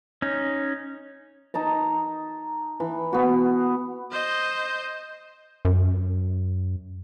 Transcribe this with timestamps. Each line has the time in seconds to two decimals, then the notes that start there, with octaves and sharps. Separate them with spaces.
0.22 C#4 D#4
1.54 D#4 A5 A#5
2.80 E3
3.13 B3 F#4
4.12 C5 D#5
5.65 F#2